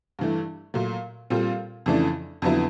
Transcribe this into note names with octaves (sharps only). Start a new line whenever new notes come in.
G2 E3 A3
A#2 F#3 A3
A#2 G3 C4 F4 A4
F2 C#3 E3 A3 D4
F2 D3 F#3 B3 E4